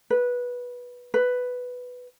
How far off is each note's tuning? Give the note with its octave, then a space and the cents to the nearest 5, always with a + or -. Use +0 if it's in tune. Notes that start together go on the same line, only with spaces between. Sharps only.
B4 -15
B4 +5